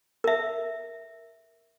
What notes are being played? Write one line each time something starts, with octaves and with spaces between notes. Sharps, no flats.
A#4 E5